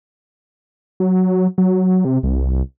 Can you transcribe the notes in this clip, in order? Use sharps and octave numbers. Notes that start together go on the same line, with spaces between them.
F#3
F#3
C3
C2